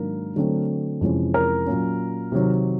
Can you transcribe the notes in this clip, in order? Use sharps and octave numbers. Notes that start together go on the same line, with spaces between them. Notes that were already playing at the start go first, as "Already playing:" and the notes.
Already playing: G#2 D#3 F#3 A#3 D4 A#4
D3 F#3 A3 C4
F2 C3 E3 G#3 C#4
A#4
A#2 F#3 A#3 C#4
C3 D#3 F#3